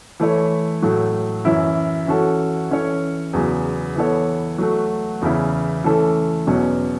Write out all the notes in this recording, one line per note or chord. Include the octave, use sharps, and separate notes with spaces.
E3 A3 E4 C#5
A2 F#3 A3
F#2 E3 C#4 E4
E3 C#4 F#4 A4
E3 C#4 A4 C#5
E2 C#3 F#3
E3 B3 A4 C#5
F#3 A3 F#4
E2 C#3 E3 C#4 E4
E3 A3 C#4 A4
E2 B2 F#3 C#4